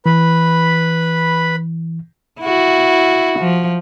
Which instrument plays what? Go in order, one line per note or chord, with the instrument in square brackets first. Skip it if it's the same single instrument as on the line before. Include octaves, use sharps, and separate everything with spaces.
[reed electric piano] E3 [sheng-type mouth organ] B4 B5
[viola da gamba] E4 F#4
F3